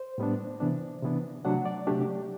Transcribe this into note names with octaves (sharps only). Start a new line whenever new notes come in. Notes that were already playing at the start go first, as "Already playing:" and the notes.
Already playing: C5
A2 G3 B3 D4
C3 E3 B3 D4
C3 E3 B3 D4
C3 F#3 A3 D4 F#5
D5
C3 F#3 A3 D4 G4